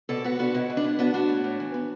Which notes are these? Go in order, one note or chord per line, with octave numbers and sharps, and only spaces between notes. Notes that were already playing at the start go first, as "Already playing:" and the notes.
B2 A4 D5
B3 F#4 B4
B3 D4 F#4
B2 E4
B2
D4
B3 E4
B3 D4 F#4
B3 D4 F#4
A2
A2
E3
B3